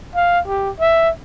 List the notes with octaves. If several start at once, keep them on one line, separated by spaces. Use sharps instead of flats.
F5
G4
E5